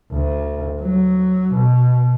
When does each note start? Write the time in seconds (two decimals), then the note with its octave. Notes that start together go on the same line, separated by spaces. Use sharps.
0.12 D2
0.81 F#3
1.54 B2